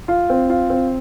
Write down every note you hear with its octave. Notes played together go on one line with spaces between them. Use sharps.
F4
C4
F4
C4